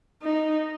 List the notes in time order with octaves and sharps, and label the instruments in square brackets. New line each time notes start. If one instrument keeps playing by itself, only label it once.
[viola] D#4